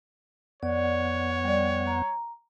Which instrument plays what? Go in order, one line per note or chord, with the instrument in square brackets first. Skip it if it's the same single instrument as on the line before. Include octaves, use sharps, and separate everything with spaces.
[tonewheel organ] F2 B3 F#5 [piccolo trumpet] C#5 [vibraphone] D5
[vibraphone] G3 D5
A#5